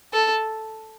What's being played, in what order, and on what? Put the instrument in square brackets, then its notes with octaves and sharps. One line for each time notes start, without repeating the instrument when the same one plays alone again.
[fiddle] A4